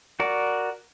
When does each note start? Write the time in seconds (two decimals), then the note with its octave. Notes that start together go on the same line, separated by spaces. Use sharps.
0.20 F#4 A#4 D5